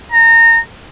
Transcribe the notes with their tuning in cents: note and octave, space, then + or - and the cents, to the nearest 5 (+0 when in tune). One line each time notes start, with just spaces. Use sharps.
A#5 -25